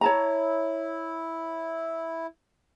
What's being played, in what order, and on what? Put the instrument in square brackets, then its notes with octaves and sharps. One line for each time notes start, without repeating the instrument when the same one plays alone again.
[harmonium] E4 [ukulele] C#5 A5 A#5